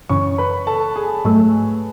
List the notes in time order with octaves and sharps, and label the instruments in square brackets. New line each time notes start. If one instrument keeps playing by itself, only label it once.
[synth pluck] F#2 C#3 E3 [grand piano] C#5 C#6
[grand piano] B4 B5
A4 A5
G#4 G#5
[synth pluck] G#2 F#3 A3